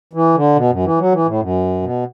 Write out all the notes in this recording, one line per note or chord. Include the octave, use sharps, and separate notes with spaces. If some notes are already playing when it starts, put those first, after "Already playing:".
E3
D3
B2
F#2
E3
F#3
E3
A2
F#2
B2